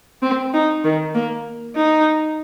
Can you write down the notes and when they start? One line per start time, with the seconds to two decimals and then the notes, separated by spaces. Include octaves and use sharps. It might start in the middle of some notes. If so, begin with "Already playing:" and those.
0.22 C4
0.54 D#4
0.84 D#3
1.15 A#3
1.76 D#4